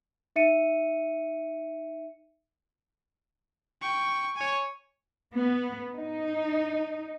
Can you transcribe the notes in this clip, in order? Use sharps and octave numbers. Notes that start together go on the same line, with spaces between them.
D#4 E5 C#7 D#7
G5 C#6
C#5 G#5
B3
D#4